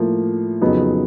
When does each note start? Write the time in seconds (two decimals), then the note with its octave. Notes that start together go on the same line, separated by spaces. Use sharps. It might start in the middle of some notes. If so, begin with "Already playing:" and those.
Already playing: A2 F3 A#3
0.61 F2 C#3 F#3 B3 D#4